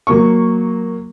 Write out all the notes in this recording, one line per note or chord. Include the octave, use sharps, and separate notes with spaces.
F#3 A#3 C#6